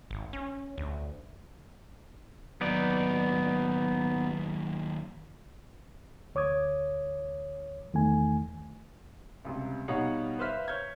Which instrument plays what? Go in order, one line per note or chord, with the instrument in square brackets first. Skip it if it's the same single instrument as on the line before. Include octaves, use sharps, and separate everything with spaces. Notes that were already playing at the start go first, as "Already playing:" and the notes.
[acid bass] G#1
C#4
D2
[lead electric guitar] D#2 F#3 [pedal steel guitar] B3 D#4 D5
[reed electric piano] D2 C#5 D6 D#6 G#6
E2 D#3 A3 G#5
[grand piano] C#2 C3 G3
B2 G3 D#4 C#5 F5 F#5
B4 C5 E5 F5 F6 B6
C#5 F6 G6 G#6